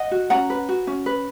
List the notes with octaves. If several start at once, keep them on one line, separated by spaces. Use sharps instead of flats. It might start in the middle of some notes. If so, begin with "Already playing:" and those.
Already playing: D#5 F#5
F#4
C#4 F#5 A#5
B4
F#4
C#4
B4